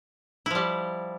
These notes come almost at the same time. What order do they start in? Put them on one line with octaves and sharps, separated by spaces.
E4 F3 G3